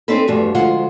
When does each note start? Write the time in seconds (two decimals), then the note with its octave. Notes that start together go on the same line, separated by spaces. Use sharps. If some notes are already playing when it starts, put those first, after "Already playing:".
0.08 C4 C#4 D#4 A4 B4
0.27 E2 G2 B2 F3 G3 A3
0.55 D2 F3 G#3 F4 F#5